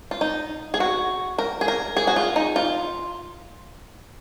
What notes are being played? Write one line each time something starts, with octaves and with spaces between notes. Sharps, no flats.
F4
D#4
G#4
F#4
A#4
G#4
A#4
G#4
F#4
F4
D#4
F4